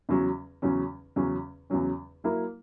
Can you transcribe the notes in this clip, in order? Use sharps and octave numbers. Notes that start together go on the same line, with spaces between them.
E2 C#3 F#3 C#4
E2 C#3 F#3 C#4
E2 C#3 F#3 C#4
E2 C#3 F#3 C#4
F#3 A#3 E4 A#4